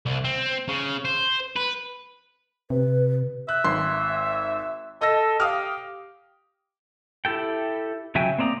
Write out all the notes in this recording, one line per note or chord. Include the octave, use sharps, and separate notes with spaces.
C2
C4
C#3
C5
B4
C3 B4
E5 F#6
G#1 C6
A4 D#5 E6 A#6
G4 F5 D#6 F6
E4 G4 A4 G5
C#3 F#3 E5 G5 G#5
A#3 C4 D5 A#5 D#6